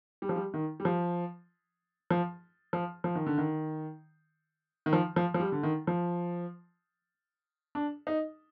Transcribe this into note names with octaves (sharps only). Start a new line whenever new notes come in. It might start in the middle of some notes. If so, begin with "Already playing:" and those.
G3
F3
G3
D#3
G3
F3
F3
F3
F3
D#3
D3
D#3
D#3
F3
F3
F3
G3
D3
D#3
F3
D4
D#4